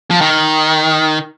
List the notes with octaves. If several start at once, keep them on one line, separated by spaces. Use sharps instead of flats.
F3
D#3